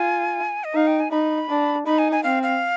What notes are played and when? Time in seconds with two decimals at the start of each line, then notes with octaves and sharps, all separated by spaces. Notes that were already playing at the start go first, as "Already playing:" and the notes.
Already playing: F4 G#5
0.64 D#5
0.74 D#4 F5
0.87 G5
1.00 G#5
1.11 D#4 B5
1.49 D4
1.86 D#4 B5
1.98 G#5
2.12 G#5
2.23 C4 F5
2.43 F5